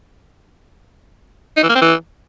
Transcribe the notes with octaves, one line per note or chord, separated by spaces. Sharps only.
D#4
E3
A#3
C4
E3